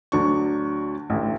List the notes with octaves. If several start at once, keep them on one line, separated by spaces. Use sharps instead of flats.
D2 F#3 D4 C#6
A1 D2